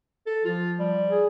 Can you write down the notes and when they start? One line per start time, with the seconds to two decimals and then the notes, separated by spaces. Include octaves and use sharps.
0.27 A4
0.45 F3 F4
0.79 G3
1.11 G#4